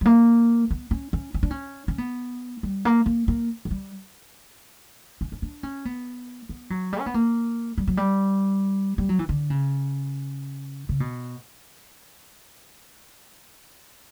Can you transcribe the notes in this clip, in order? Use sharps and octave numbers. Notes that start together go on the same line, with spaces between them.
G3
A#3
B3
C#4
C#4
C#4
D4
C#4
C#4
B3
G3
A#3
A#3
A#3
F#3
G3
C#4
C#4
D4
C#4
B3
B3
F#3
G3
C#4
B3
A#3
G3
F#3
G3
G3
F#3
E3
D3
C#3
C#3
B2